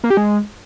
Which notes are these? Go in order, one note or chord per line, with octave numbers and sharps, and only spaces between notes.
A#3
G4
G#3